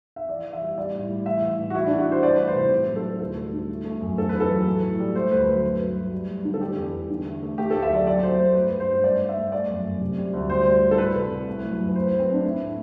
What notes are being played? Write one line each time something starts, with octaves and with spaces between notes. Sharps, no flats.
E5
E3 D5
E3
E5
G3
G3 D5
A2
G3
E3 E5
E3
A2
F#4
E3 E4
E3 D4
F#4
G3 C5
A3 D5
E3 B4
C5
C3
A2
F#3
A4
A2
D2 A4
G3
D3
A3
A3
F#2
E2 A4
B4
E2
A4
F#3
A2
A2
G3
A3 C5
D2 B4
F#3
G2 B4
F#3
A3
G3
G3
D3
A4
G3 G4
E2
E2
D3
A3
A3
A3 G4
D2 A4
E5
F#3 D5
F#3 D5
F#3 C5
A3 C5
G2 B4
G3
C5
G2
C5
G2 D5
A3
E5
A3
A3 D5
F#2
F#2
C3
G3
D2
G3 C5
G3
A2
A4
G3 B4
C3
C2
A3
F#3
F#2
B4
F#3 C5
F#3 B4
C4
A3 D4
A3 E4
A2